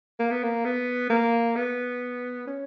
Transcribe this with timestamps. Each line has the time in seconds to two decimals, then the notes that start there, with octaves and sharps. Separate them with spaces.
0.19 A#3
0.31 B3
0.44 A#3
0.65 B3
1.10 A#3
1.56 B3
2.47 C#4